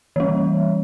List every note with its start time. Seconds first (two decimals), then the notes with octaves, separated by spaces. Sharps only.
0.16 E3 G3